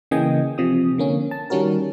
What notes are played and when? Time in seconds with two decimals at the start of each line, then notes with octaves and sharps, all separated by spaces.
0.11 C#3 E3 A#3 D#5 G5 G#5
0.58 C3 F3 D#6
0.98 D3 A#3 C#4
1.31 A5
1.50 D#3 G3 C#4 F#4 A#4